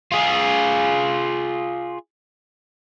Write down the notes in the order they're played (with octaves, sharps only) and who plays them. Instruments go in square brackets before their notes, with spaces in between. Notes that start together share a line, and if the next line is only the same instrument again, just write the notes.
[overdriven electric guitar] F4 G#4